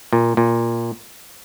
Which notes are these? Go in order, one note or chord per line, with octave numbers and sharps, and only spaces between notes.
A#2
A#2